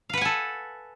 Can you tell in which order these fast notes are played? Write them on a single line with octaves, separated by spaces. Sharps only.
F5 B4 F#5 G#5 A4